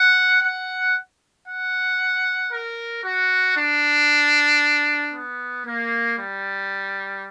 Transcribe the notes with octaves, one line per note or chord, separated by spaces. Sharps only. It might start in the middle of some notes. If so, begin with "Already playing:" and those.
Already playing: F#5
F#5
F#5
A#4
F#4
D4
B3
A#3
G3